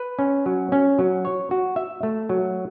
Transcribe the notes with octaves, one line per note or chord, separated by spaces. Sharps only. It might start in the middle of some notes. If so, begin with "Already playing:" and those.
Already playing: B4
C#4
F#3
C#4
F#3
C#5
F#4
E5
A3
F#3